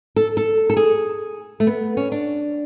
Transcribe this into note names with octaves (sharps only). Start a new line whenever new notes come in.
A4
A4
A4
G#4
A3
B3
C#4
D4